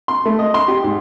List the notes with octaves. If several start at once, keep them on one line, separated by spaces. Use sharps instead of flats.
C6
A3
D#5
C6
G4
G#2